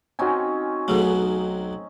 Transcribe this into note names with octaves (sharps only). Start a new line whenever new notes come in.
C4 C#4 D#4 F#4 G#5
B1 B2 F#3 A3 G#4 A4